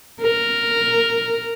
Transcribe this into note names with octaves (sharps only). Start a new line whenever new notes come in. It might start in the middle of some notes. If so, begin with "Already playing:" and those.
A#4